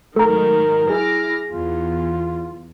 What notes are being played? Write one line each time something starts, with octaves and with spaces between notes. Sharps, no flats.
G#2 D#3 F#3 A3 A4 A#4 A#5
E4 G#4 D6 F6 A#6
E2 F4